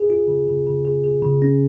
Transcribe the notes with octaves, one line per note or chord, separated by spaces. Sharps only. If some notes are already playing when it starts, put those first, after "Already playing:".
Already playing: G#4
F4
C#3
C#3
C#3
G#4
G#4
C#3
C#4